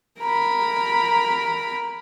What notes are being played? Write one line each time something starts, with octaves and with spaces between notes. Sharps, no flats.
A#4 B5